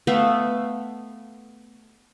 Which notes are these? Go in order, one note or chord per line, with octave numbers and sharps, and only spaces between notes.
A3 B3 E5 F5